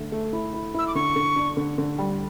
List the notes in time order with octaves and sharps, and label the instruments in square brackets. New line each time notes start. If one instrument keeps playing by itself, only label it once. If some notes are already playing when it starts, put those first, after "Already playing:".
Already playing: [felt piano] D3 A3
A3
E4
E4
[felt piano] E4 [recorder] E6
[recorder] D6
[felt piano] D3 [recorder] C#6
[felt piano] D3
D4
D3
D3
G3